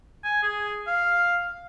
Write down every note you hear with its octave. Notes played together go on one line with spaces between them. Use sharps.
G#5
G#4
F5